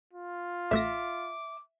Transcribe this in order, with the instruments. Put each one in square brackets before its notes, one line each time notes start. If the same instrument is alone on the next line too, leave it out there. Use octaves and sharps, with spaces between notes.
[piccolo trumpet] F4
[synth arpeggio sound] A1 A3 A#6 [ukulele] E5 [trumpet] D6